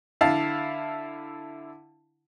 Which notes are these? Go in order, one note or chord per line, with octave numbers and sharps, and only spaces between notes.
D3 E4 F5 A5